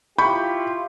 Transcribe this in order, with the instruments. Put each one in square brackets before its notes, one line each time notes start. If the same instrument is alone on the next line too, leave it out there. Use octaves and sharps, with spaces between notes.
[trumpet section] E4 F4 G4 [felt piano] B5 C#6 G6